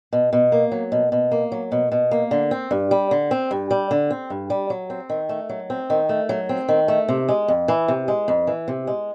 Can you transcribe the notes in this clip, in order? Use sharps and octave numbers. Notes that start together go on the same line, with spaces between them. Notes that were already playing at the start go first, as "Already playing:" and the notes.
B2
B2
A#3
F#3
B2
B2
A#3
F#3
B2
B2
A#3
D3
C4
G2
G3
D3
C4
G2
G3
D3
C4
G2
G3
F#3
C4
D#3
A3
F#3
C4
D#3
A3
F#3
C4
D#3
A3
C3
G#3
F2
E3
C3
G#3
F2
E3
C3
G#3